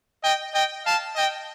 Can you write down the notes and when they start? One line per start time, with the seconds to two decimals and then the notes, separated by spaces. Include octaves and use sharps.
0.23 D#5 G5
0.54 D#5 G5
0.85 F5 A5
1.16 D#5 G5